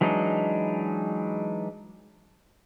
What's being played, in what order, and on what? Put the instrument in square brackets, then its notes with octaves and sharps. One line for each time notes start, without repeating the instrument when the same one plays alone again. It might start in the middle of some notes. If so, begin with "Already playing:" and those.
[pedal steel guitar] E3 F#3 G#3 D4 D#4